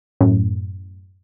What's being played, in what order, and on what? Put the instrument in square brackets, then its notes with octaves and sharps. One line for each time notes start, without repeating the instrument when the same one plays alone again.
[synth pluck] F#2 A2